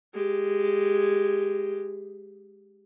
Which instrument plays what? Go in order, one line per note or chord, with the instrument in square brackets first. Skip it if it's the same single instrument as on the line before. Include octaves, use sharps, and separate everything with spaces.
[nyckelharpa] G#3 G4